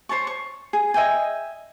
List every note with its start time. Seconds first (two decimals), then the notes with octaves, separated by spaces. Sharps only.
0.09 C5 C#5 A5 C#6
0.27 C#6
0.73 G#4
0.94 D#5 E5 G5 G#5